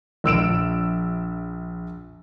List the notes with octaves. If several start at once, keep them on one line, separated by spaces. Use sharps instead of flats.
A#1 E6 D7 E7